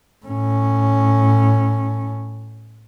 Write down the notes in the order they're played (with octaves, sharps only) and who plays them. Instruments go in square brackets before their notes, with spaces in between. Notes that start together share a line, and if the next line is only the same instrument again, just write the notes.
[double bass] A2 C#4